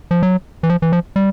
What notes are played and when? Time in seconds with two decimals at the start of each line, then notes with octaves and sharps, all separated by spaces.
0.11 F3
0.23 F#3
0.63 E3
0.70 F3
0.82 E3
0.93 F3
1.16 G3